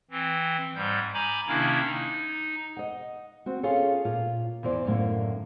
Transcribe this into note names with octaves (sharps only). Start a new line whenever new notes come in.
E3 C4
G#2 G3 G6
G#5 A#5 B5 D6 G6
C3 D#3 A#3 C#4 D4 E4
D#4
D#5 F#5
C4 F#4
C#4 F4 G#4 A4 C#5
A#2 F4
E2 E3 C5 D5
F#2 A2 D3 A#3